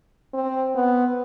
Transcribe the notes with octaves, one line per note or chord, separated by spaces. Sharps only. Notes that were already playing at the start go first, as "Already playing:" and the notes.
C4
B3